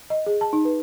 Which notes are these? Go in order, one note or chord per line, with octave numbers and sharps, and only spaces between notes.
D#5
G#4
A5
D#4
B4